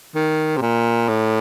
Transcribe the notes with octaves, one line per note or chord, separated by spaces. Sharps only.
D#3
C3
A#2
A2